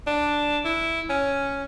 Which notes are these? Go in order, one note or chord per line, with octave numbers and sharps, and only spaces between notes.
D4
E4
C#4